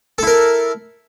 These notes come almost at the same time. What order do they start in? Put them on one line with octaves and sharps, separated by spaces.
A4 E4 A#4